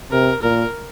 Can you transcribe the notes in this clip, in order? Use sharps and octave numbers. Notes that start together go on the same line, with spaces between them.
C3 A#4
A#2 A#4